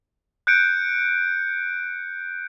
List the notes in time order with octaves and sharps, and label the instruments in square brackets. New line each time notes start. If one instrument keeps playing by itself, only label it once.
[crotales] F#6 G6 C#7 D7